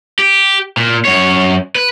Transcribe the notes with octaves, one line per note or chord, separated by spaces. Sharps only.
G4
A#2
F#2 C#5
B4